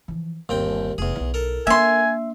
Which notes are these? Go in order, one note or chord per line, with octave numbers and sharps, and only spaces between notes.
E3 F3
G1 D#2 C4 G5
F1 E2 G#4
B1 E4
A4 A#4
A#3 D4 E5 G#5 C6